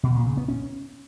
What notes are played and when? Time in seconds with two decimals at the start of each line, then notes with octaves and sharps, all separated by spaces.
0.03 B2
0.15 A#2
0.26 C#3
0.37 B3
0.48 C#4